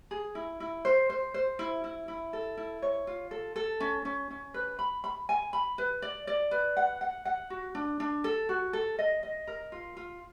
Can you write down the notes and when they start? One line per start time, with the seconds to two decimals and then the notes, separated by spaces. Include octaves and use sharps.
0.11 G#4
0.35 E4
0.60 E4
0.85 C5
1.10 C5
1.34 C5
1.59 E4
1.84 E4
2.08 E4
2.33 A4
2.57 E4
2.82 C#5
3.07 F4
3.31 A4
3.56 A4
3.80 C#4
4.05 C#4
4.30 C#4
4.54 B4
4.79 B5
5.04 B5
5.29 G#5
5.53 B5
5.78 B4
6.02 D5
6.27 D5
6.51 B4
6.77 F#5
7.01 F#5
7.25 F#5
7.50 F#4
7.75 D4
8.00 D4
8.24 A4
8.49 F#4
8.73 A4
8.99 D#5
9.23 D#5
9.47 A#4
9.72 F4
9.97 F4